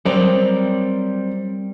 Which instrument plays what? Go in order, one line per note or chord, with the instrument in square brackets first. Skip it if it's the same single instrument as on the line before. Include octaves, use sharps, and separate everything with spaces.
[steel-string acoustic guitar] F#3 C4 A#5 [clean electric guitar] G3 A#4 D5 [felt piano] C5